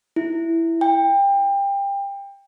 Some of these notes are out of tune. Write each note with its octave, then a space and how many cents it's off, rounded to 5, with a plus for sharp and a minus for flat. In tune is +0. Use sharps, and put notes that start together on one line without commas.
E4 +5
G5 +25